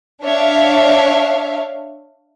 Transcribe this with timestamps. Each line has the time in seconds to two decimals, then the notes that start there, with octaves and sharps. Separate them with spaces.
0.23 D4 C#5 E5 F5